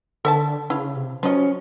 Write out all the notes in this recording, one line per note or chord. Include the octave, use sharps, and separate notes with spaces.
D3 A4 E5 A5
C#3 E4 F5
C3
F3 F#3 C#4 D#5